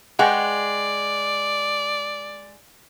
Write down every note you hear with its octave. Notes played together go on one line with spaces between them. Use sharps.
G#3 D5 F#5 G5